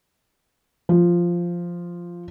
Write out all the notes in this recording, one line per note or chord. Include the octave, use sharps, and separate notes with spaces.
F3